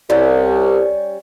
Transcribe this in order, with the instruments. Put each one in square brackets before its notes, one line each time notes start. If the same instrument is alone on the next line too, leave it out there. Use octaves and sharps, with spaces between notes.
[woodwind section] C2 [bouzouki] G3 C#4